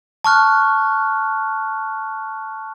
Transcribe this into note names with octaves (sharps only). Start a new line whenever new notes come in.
A5 C#6 F6 F#6